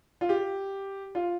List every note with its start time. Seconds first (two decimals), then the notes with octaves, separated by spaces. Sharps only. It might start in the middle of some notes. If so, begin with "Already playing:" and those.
0.21 F4
0.29 G4
1.15 F4